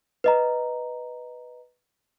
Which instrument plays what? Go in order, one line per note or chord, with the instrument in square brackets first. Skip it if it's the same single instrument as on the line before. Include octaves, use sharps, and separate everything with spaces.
[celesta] B4 D#5 A#5